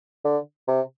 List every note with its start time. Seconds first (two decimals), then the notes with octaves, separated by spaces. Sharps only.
0.25 D3
0.68 C3